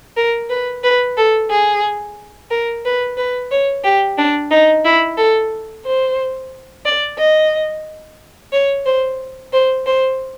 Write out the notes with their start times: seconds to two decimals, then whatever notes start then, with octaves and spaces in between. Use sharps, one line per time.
0.17 A#4
0.50 B4
0.84 B4
1.17 A4
1.51 G#4
2.51 A#4
2.85 B4
3.17 B4
3.51 C#5
3.84 G4
4.18 D4
4.51 D#4
4.85 E4
5.18 A4
5.86 C5
6.86 D5
7.19 D#5
8.53 C#5
8.86 C5
9.53 C5
9.86 C5